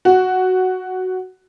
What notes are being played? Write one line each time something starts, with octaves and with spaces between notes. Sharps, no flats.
F#4